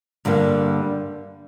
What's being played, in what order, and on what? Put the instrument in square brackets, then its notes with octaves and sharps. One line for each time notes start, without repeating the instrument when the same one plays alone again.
[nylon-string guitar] G2 D3 G3 A#3